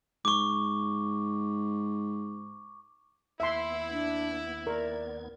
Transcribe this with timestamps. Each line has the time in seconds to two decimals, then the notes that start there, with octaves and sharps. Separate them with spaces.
0.25 G#2 C#6 D6
3.40 D#2 B3 E4 E5 C6 G#6
3.91 D4
4.67 A#4 D5